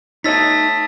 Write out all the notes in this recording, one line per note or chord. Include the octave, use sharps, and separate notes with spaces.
A3 D#4 C#5 D#5 D#6 E6 A6 B6